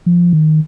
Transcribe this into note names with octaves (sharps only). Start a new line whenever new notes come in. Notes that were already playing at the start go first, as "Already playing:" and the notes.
F3
D#3